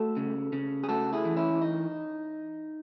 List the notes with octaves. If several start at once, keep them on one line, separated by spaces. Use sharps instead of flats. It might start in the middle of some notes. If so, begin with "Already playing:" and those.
Already playing: A3 F#4 A4
C#3
C#3
G#4
A3 F#4 A4
E4 G#4
E3
C#4 E4
D#4